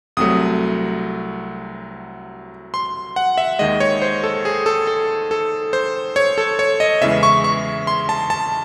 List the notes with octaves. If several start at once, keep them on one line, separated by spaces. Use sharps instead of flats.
C2 C3 F#3 A3 D#6
C6
F#5
E5
D#2 D#3 G#3 D#5
C#5
C5
A4
G#4
A4
A4
A4
C5
C#5
A4
C#5
D#5
E2 C#3 E3 G#3 E5
C#6
C#6
C6
A5
A5